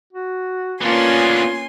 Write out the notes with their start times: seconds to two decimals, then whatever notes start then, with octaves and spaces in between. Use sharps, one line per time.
0.13 F#4
0.81 A#3 B3 C#4 D4 F4 G#5 C6